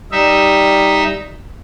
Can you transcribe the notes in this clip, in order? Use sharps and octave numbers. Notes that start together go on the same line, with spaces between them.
G3 D#4 E5